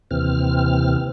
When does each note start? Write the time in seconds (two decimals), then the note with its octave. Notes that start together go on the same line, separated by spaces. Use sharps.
0.11 D#2 C3 E3 C4 F6